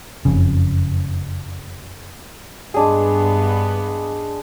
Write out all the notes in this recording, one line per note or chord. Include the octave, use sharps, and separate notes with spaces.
F#1 F2 C#3
G2 G#3 B3 D4 G#4